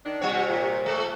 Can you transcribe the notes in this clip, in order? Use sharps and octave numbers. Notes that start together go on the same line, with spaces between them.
D#3 D4
C3 G3 C4 F#4 C#5
A#2
G#3 A3